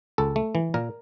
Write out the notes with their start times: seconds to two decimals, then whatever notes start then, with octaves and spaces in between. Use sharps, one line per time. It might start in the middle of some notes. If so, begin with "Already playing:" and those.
0.18 C#2 A4
0.36 A3
0.55 E3
0.74 A#2 A#4